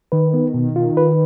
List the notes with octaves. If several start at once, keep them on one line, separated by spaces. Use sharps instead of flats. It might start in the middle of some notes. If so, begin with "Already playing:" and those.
D#3 B4
B3
B2
F4
B4